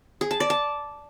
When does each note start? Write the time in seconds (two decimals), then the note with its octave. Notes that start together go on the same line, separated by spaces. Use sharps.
0.21 G#4
0.31 A5
0.40 D5
0.50 A5